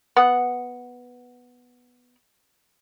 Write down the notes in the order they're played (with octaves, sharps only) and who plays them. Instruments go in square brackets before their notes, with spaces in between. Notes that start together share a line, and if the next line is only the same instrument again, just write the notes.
[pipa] B3 F#5